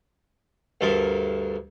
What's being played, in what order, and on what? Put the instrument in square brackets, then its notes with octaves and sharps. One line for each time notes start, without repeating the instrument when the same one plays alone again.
[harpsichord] D2 G2 A4 A#4 E5 C6